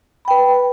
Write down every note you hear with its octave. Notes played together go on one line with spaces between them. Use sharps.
B4 G5 B5